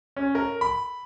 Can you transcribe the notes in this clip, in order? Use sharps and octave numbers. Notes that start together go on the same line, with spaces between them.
C#4
A#4
B5